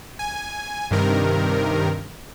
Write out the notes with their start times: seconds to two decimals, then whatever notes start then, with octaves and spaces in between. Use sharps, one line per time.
0.19 G#5
0.91 G2 C3 D#3 A#4